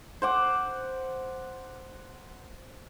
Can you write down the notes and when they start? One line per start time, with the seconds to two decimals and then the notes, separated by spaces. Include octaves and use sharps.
0.22 C5 F#5 D6